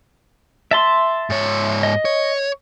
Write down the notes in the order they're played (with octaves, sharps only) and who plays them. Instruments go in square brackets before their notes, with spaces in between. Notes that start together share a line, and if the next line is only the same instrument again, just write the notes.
[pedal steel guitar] E5 A5 C6
[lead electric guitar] G#2 C#5
[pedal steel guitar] D#5
[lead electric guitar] C#5